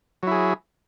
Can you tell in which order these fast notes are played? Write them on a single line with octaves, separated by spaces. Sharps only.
F#3 E4 G#4